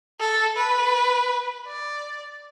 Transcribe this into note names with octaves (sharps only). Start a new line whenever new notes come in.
A4
B4
D5